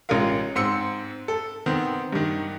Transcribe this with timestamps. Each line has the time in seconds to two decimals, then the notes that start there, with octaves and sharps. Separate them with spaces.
0.09 A1 G#3 F4 A#4 F5
0.55 G#2 C4 C6 E6 C#7
1.28 A4
1.66 D#3 B3 C4
2.13 G2 D#3